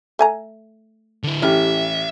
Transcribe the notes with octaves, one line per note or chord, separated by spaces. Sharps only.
A3 G#5 A#5
D3 E4
A1 E4 G4 E5 F6